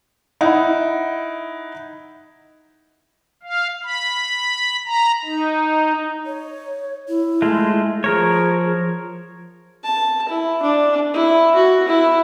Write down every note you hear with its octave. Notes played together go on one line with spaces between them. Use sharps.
D#4 E4 F#5
F5
B5
A#5
D#4
C#5
E4
G#3 A3 F4
F3 G#4 A#4 C#5
A5
E4
D4
E4
F#4
E4